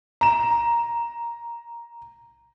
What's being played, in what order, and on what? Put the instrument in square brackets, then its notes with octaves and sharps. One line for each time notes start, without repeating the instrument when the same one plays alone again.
[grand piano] A#5 E7